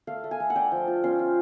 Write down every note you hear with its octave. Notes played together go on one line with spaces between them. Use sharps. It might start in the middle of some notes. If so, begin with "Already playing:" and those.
A3 F5
A3
G#5
A3
F#5
D4 G5
F3
F4
C#4 C6
F4